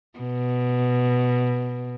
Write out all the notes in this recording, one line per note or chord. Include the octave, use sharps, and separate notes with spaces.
B2